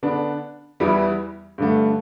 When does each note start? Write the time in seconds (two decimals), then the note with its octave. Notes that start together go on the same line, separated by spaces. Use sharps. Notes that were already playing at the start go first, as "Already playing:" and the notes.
0.03 D3 B3 D4
0.80 E2 E3 G3 B3 E4
1.58 G2 D3 A3